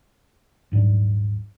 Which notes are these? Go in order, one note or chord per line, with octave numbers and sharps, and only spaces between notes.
D#1 G#2 F#3 D4